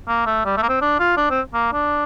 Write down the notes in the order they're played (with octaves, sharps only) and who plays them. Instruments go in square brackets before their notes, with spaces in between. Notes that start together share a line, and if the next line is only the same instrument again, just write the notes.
[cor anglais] A#3
A3
G3
A3
A#3
C4
D4
F4
D4
C4
A#3
D4